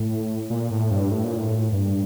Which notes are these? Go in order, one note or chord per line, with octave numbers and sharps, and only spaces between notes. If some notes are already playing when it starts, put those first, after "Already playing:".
Already playing: A2
A#2
A2
G2
A2
A#2
A2
G2